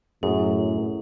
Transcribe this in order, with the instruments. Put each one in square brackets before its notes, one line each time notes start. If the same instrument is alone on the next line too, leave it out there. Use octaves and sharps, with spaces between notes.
[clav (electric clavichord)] F#2 [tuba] A2 [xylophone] G#4